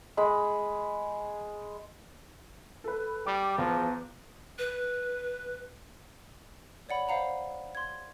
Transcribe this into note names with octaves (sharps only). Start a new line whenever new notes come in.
G#3 B5
A4 B4
G3 D6
E2 F3
B4
C#5 D5 F#5 B5
C5 D5 F5 F#5 A#5 B5
C6 G#6